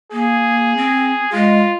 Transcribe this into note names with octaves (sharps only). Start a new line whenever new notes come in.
A#3 G#4
C4
G#3 F4